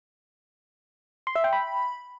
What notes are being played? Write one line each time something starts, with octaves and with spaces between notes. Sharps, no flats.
C6
E5
G5
B5